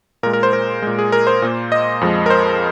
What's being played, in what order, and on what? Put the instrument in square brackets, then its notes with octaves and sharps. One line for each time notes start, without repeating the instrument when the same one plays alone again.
[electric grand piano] A#2 A#4
G#3
A#4
C5
A#4
A#2 G#3
G#4
A#4
C5
A#2 A#3
D#5
F2 F3 G#3
A#4
C5